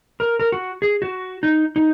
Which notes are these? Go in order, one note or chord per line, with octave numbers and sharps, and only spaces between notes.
A#4
A#4
F#4
G#4
F#4
D#4
D#4